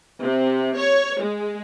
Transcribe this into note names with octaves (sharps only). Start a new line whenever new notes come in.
C3
C#5
G#3